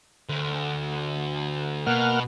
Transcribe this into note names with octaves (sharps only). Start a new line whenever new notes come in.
D2
B2 A#3 F#5 F6